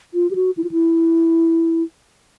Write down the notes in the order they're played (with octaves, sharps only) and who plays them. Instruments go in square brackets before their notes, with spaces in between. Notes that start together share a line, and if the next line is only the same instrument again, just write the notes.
[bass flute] F4
G4
F#4
E4
F4
E4